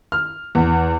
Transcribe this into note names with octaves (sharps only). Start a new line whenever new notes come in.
F6
E2